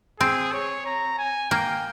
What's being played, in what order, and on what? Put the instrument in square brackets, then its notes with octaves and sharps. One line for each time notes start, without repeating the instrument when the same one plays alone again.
[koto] C4 [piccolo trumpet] G#4
[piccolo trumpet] C#5
A#5
G#5
[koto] A#3 [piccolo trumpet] G5